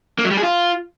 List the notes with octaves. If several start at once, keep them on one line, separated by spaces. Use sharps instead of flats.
A#3
F#3
G3
G#4
F4